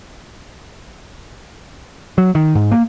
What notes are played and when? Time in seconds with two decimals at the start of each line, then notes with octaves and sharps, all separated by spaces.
2.18 F#3
2.35 D#3
2.55 G#2
2.72 A#3